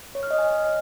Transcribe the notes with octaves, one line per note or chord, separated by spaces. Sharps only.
C#5
F6
D#5
G#5